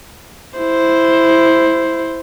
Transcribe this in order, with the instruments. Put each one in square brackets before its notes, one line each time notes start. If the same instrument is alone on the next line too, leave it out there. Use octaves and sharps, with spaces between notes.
[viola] E4 C5